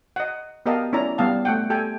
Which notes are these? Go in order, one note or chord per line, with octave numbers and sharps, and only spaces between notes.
D#5 F#5
B3 G4 A#4 D#5 F5 A5
C#4 E4 D5 A#5
G3 B3 F5 A5
A3 F#5 G5
G4 A4 G5 G#5